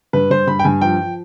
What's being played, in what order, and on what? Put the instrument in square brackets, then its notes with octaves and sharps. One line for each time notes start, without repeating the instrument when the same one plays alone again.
[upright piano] G2 B4
G2 C5
G2 B5
G5
G2 G#5
F3 G5
F3